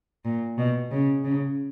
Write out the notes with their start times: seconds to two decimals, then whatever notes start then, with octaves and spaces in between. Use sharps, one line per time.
0.25 A#2
0.58 B2
0.91 C#3
1.24 C#3